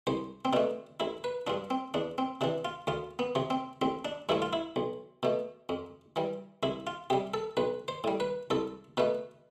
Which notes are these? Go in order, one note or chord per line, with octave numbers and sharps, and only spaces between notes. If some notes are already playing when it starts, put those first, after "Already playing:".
C2 C5
C4
B2 A3 D4
A1 E4
B4
G2 F3 D4
C4
E2 D4
C4
C3 E3 D4
F4
D2 F4
B3
C3 F3
C4
A1 C4
D4
G2 F3 A3 E4
F4
E4
B1
B2 A3
F2
E3 G3
C2 E4
F4
C3 G3 G4
A4
B1 B4
C5
A2 G3
B4
C2 A4
B2 A3 B4